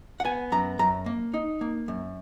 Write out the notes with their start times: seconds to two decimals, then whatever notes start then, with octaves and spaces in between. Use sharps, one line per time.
0.20 F#5
0.25 B3 G#5
0.52 F#2 A#5
0.79 F#2 A#5
1.06 A#3
1.34 D#4
1.61 A#3
1.88 F#2